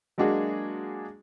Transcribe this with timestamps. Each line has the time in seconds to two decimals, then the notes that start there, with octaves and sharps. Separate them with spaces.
0.18 F#3 G#3 A#3 D4 F#4 G#4